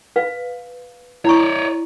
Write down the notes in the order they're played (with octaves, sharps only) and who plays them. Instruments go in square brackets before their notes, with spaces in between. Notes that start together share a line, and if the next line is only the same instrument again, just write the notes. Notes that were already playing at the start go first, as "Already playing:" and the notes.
[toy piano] B4 F5
[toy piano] E4 A#5 C#6 [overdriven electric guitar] C#5 D5